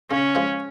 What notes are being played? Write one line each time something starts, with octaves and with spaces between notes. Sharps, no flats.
C#3 C#4
F3 G#3